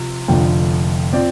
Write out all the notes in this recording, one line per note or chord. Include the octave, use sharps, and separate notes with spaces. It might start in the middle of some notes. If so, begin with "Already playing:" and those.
Already playing: C3 F3
F1 F2 D3 F3 G5
F3 C4 D5